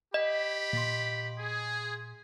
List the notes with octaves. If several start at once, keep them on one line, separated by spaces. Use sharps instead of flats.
G4 D#5 B5
A#2 C6
G#4